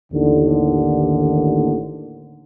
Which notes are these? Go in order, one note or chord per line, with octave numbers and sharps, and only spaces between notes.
A1 D#2 D3